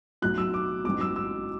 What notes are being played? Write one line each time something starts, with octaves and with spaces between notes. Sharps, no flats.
B1 A2 F#3 F#6
E6
D6
A1 G#2 F#3 D6
E6
E6